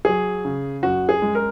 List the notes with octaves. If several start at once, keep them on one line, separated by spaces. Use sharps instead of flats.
F#3 G#4
C#3
F#2 F#4
G#4
G#3
A#4